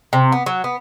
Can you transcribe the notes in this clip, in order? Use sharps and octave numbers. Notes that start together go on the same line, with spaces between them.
C3
B3
F#3
B3